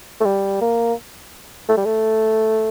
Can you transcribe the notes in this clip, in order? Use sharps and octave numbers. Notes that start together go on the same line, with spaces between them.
A3
G3
A#3
A3
G3
A3